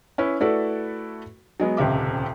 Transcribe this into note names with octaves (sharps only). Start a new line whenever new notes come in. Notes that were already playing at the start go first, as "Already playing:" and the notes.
C#4 E4 B4
A3 E4 F#4 A4 B4 D5
F#3 G#3 B3
D#1 C#2 C3 E5 D6